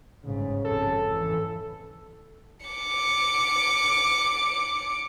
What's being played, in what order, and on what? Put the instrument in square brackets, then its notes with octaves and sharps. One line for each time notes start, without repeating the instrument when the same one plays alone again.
[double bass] G1 G#2 [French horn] C#3
[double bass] G#1 F2 [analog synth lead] A4
[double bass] E3
[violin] D6 C#7